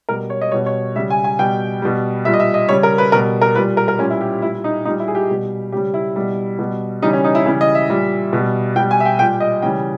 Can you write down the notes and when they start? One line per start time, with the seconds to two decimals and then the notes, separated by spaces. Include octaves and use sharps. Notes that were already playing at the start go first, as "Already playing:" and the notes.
0.09 B2 G3 A#4
0.30 C#5
0.41 D#5
0.52 B2 G3 C#5
0.66 C#5
0.96 C#3 G3 E5
1.10 G#5
1.24 G#5
1.39 B2 G3 G5
1.82 B2 G3
2.25 A#2 G3 E5
2.34 D#5
2.40 E5
2.54 D#5
2.69 C#3 G3 C#5
2.83 A#4
2.98 B4
3.12 B2 G3 A#4
3.41 A#4
3.55 A#2 G3 B4
3.77 A#4
3.88 A#4
3.99 A#2 G3 C#4
4.10 E4
4.21 G4
4.42 A#2 G3 E4
4.64 D#4
4.85 A#2 G3 D#4
5.00 E4
5.08 G#4
5.15 G4
5.29 B2 G3
5.72 C#3 G3 G4
5.94 E4
6.16 B2 G3
6.59 B2 G3
7.02 C#3 E3 G3 D#4
7.13 C#4
7.24 D#4
7.35 E4
7.46 C#3 E3 G3 E4
7.61 D#5
7.75 E5
7.89 A#2 G3
8.33 B2 G3
8.76 B2 G5
8.79 G3
8.91 G#5
9.00 E5
9.05 G5
9.19 A#2 G3 G5
9.40 D#5
9.62 C#3 E3 G3 G5